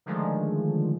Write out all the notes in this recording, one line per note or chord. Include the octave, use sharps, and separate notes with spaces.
D3 D#3 F3 G#3 A3